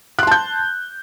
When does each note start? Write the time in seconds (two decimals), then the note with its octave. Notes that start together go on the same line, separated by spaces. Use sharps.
0.19 F#6
0.23 C6
0.27 A5
0.31 G6